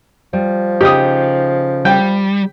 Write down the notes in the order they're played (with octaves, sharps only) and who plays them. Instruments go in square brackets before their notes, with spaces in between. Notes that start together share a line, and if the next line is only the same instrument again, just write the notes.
[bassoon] F3 [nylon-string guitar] G3
[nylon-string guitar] C#3 A3 D#4 [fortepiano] G4 D#6
[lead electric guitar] G3 [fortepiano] G5